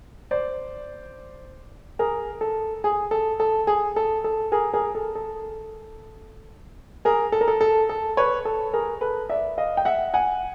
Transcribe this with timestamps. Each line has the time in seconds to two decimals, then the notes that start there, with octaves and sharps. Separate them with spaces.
0.31 C5 D5
1.99 G#4 A#4
2.41 A4
2.84 G#4
3.11 A4
3.40 A4
3.67 G#4
3.96 A4
4.24 A4
4.52 G#4 A#4
4.74 G#4 A#4
4.95 A4
5.15 A4
7.05 G#4 A#4
7.32 A4
7.41 A#4
7.48 A4
7.61 A4
7.89 A4
8.17 B4 C#5
8.45 A4
8.73 G#4 A#4
9.01 A4 B4
9.29 D5 E5
9.58 D#5 F5
9.77 G5
9.85 E5 F#5
10.14 F#5 G#5